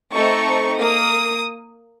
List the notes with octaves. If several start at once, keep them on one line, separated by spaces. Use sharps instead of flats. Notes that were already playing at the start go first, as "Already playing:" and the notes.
A3 C4 D#4 A4 C#6
A#3 D#6